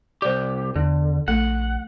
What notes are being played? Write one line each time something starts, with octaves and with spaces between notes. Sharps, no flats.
C2 G4 C5 D5
E2 D3
A#1 A3 A4 F#5